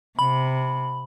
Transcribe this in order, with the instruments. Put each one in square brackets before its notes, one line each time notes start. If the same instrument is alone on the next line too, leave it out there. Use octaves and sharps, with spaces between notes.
[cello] C3 [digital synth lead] B5